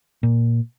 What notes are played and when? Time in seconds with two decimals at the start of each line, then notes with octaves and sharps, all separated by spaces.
0.23 A#2